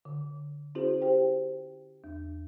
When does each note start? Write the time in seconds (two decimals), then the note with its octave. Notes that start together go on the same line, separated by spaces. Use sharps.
0.05 D3
0.75 C#4 E4 F#4 G#4 C5
1.02 G4 C5 G5
2.04 E2